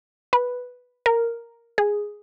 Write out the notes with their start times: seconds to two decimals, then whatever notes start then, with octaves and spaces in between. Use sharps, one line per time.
0.33 B4
1.06 A#4
1.78 G#4